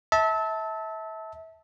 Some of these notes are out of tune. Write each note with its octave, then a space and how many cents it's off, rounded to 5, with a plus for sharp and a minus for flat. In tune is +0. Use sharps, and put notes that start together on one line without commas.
E5 -30 A5 +0